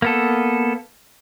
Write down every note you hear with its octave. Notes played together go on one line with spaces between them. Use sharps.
A#3 B3 A4